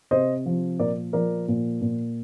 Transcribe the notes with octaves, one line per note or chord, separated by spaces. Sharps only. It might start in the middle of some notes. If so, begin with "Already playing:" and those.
C3 C5 D#5
F3
A#2 A#4 D5
F3 A#4 D5
A#2
A#2